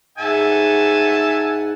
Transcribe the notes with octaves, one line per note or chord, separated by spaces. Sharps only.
G#2 E5 F#5 G#5 A5